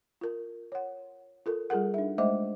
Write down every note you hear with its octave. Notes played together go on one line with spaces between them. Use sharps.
F4 A#4
C#5 F#5
F4 A4 A#4
G3 F4 G#4 A#4 F#5
D4 D#4 E5
G#3 A3 C5 D#5 E5 D6